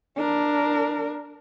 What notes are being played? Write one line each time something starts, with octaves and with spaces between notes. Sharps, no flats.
D4 A#4